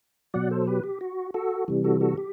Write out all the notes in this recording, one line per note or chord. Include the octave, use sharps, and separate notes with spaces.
B2 F#3 D5 F#5
A4 C5
G4 B4
G4
F#4
F#4 A4
C3 E3 G3
F#4 A4
F#4 A4
G4